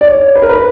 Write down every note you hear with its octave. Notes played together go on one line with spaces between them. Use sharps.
D5
C#5
B4
A#4
B4